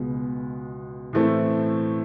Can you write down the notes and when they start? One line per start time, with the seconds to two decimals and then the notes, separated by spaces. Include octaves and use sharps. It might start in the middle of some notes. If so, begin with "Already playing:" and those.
Already playing: C#2 B2 G#3 B3
1.13 A2 E3 A3 C4 E4